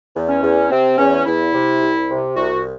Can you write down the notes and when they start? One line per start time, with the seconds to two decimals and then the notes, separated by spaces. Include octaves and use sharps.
0.15 E2
0.29 C#4
0.42 E2
0.71 C3 C4
0.98 E2 C#4
1.25 E2 E4
1.53 C3
1.81 C2
2.09 C3
2.36 C2 F#4